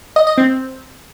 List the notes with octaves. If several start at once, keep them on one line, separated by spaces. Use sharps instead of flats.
D#5
D#5
C4